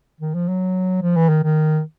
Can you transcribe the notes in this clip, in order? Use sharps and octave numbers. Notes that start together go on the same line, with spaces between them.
D#3
F3
F#3
F3
E3
D#3
D#3